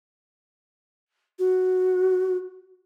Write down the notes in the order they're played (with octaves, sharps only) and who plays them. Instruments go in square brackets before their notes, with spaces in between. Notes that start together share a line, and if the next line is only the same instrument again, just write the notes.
[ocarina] F#4